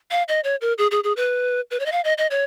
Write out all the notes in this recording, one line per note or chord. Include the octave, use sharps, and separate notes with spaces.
F5
D#5
C#5
A#4
G#4
G#4
G#4
B4
B4
C#5
D#5
F5
D#5
D#5
C#5